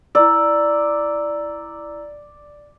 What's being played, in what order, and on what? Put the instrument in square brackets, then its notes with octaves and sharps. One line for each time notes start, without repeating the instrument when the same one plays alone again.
[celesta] E4 A#5 E6 [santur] D5